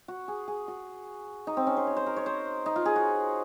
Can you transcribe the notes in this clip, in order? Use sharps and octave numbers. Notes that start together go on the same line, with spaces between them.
F#4
G#4
G#4
F#4
D#4
C4
C#4
C5
C#5
C5
A#4
C#5
C5
D#4
F4
G#4
F#4